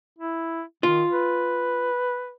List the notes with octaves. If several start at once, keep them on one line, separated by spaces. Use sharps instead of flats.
E4
D#3 F4
B4